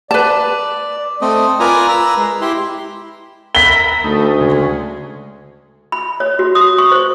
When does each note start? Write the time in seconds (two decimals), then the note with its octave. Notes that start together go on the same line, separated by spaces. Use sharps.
0.11 B4 D5 A5
1.22 A3 C4 D#5
1.60 F4 A#4 B4 D5 G#5 A#5
1.88 B4 A#5 E6
2.17 G#3
2.41 E4 G4 C6
3.55 A#4 E5 B5 B6 G7
4.04 D2 A3 D#4
4.40 C#3 G#3
5.92 B5
6.20 C#5
6.39 F#4
6.55 D#6
6.78 C#6
6.92 C5